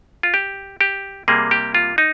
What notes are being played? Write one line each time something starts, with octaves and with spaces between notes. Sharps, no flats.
F4
G4
G4
C3 G3 A#3 G#4
G4
F4
D#4